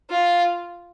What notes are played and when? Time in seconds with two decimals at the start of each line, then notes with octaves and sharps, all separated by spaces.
0.10 F4